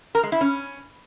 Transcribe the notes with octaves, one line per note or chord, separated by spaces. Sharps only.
A#4
G#3
E4
C#4